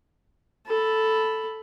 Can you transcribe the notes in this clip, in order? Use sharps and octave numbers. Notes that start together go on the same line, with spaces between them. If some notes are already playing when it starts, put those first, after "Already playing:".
A4 B5